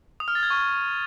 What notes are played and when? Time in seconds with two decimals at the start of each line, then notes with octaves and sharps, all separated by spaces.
0.20 D#6
0.28 F6
0.35 A6
0.43 G#6
0.50 C#6